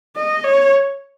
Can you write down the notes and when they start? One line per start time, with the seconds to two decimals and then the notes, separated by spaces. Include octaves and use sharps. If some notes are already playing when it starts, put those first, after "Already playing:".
0.16 D#5
0.44 C#5